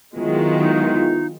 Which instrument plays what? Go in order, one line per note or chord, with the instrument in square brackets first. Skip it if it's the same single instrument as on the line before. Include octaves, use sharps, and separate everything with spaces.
[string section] D#3 F#3 G#3 [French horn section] B3 E4 F4
[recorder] D#4